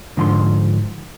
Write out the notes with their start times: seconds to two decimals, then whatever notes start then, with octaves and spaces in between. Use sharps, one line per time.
0.17 G#2 D3 F3 B5 C6